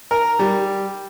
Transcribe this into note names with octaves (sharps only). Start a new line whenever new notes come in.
A#4
G3